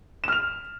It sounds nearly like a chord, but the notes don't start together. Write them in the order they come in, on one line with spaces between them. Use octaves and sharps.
E7 F6 F7